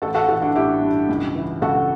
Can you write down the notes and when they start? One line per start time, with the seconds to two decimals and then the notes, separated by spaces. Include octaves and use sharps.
0.02 A1 F#4 A4
0.15 F#4 A4
0.28 E3 F#4 A4
0.42 D4 F#4
0.55 A1 E4 G4
0.82 G2
1.09 C#2
1.35 E3
1.62 C#2 F#4 A4